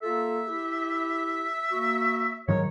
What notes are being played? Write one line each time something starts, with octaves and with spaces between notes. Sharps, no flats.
A#3 F4 A4 E5
E4 G4
A#3 F#4
G#2 D#3 F#3 A#4 C#5